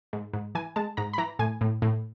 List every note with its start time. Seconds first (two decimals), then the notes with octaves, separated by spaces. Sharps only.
0.13 G#2
0.33 G#2
0.55 E3 G#5
0.76 G#3 A5
0.97 G#2 A#5
1.13 B5
1.18 E3 A#5
1.39 A2 G#5
1.61 A2
1.82 A2